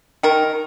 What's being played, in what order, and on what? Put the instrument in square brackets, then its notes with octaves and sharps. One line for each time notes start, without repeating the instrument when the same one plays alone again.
[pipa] D#3 A#4